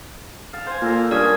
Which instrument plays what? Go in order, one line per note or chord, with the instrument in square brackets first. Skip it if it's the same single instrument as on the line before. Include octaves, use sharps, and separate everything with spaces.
[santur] F5 A5
C5 G#5
[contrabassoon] A#2 [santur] A#3 A4 A#5
[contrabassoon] G2 [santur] C#4 D4 G#4 [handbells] A#4 D5 G#6